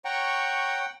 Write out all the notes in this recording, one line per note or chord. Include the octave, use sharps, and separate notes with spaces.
C#5 F#5 G5 A#5 C#6